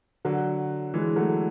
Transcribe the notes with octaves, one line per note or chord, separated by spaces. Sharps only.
D3 F#3
E3 G#3
F#3 A3